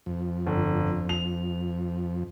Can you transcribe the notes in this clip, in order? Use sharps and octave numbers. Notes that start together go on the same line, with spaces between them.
F2
G1
F7